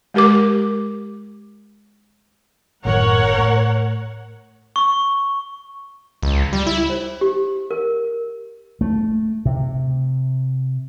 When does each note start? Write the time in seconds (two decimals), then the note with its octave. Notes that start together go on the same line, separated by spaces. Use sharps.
0.14 G#3 G4 A#4 D6
2.85 F#1 A2 D#3 A#4 C#5 F#5
3.38 A2
4.76 C#6
6.23 C#2
6.53 G3
6.67 E4
6.90 C5
7.21 G4
7.71 A#4
8.81 A3
9.45 C3